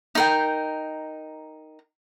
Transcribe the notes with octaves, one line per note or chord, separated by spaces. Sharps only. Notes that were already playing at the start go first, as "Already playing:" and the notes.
D#4 A#4 G5